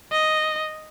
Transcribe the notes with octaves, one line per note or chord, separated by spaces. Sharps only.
D#5